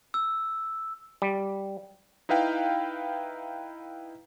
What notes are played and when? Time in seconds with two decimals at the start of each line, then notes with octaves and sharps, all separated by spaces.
0.14 E6
1.22 G3
2.29 D#4 E4 B4 F5 G5